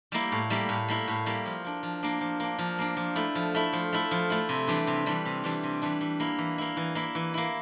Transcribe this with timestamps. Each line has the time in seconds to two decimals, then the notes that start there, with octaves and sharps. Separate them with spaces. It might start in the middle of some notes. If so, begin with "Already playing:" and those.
0.12 G3 A#3 E4
0.32 A2
0.50 G3 A#3 E4
0.69 A2
0.88 G3 A#3 E4
1.08 A2
1.26 G3 A#3 E4
1.45 F3
1.64 A#3 D4
1.83 F3
2.03 A#3 D4
2.21 F3
2.40 A#3 D4
2.59 F3
2.79 A#3 D4
2.97 F3
3.16 A3 E4
3.35 F3
3.54 A3 E4
3.73 F3
3.93 A3 E4
4.11 F3
4.30 A3 E4
4.49 C3
4.67 E3 G3 D4
4.87 C3
5.06 E3 G3 D4
5.25 C3
5.44 E3 G3 D4
5.63 C3
5.82 E3 G3 D4
6.01 E3
6.20 A#3 E4
6.38 E3
6.58 A#3 E4
6.77 E3
6.95 A#3 E4
7.15 E3
7.34 A#3 E4